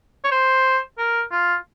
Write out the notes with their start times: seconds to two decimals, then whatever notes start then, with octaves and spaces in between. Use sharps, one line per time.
0.24 C#5
0.32 C5
0.98 A#4
1.32 F4